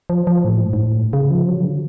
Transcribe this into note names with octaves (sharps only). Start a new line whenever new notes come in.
F3
F3
A2
G#2
G#2
A2
C#3
F3
F#3
C#3
D3